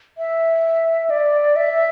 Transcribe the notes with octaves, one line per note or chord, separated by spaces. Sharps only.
E5
D5
E5